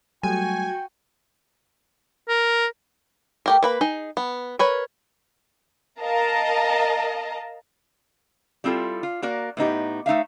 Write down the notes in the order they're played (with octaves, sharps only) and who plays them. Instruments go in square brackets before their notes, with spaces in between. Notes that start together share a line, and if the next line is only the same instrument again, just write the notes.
[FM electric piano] F#3 G3 A3 [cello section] F#4 [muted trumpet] G5 [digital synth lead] G#5
[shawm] A#4
[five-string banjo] A3 G4 A#4
A#3 B4 B5
D#4 G#4
B3
A#4 B4 C#5
[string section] A#4 D#5 F5 A5 A#5
[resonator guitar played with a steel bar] G3 C4 E4 F4 A4
F4
A#3 F#4 A#4 D5
A2 B3 D#4 G4
A3 D#4 E5 F5